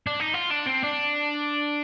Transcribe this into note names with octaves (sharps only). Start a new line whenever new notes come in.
D4
D#4
F4
D4
C4
D4